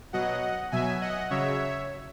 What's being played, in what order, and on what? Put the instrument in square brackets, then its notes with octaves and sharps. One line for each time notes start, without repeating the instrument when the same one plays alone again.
[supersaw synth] B2 F#3 D#5 F#5
B2 F#3 E5 G#5
D#5 F#5
C#3 F#3 C#5 E5